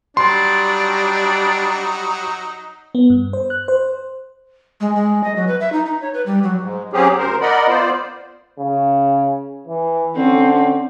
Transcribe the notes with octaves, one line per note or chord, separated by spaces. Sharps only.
F#3 G3 D4 D#4 C6
B3
G2
C5
F#6
C5
G#3
G#3
D#5
F#3
B4
E5
D#4
D#4
C#5
B4
G3
F#3
G#2
F#3 C4 C#4 G4 G#4
D2 A#4 C5
A#4 D5 D#5 F#5 B5
B3 F4 C5 D5
C#3
E3
D3 C4 C#4